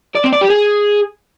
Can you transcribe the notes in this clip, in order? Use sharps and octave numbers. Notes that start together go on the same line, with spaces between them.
D5
C4
D5
G4
G#4